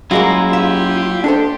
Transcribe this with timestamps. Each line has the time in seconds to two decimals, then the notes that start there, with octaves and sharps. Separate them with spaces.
0.11 F#2 F#3 G#3 A#3 E4 F4
0.53 G4 E5
1.24 D4 A4 C5